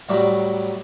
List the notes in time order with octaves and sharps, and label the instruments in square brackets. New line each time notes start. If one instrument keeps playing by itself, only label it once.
[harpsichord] A2 F#3 G3 D5 A#5 C#6